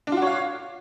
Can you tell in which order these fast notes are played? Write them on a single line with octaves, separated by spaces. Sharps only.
D4 F4 F#4 C#5 F5